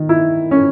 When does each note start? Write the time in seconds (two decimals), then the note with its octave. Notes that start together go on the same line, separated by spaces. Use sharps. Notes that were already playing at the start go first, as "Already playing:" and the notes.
Already playing: D#3
0.09 E4
0.51 C#4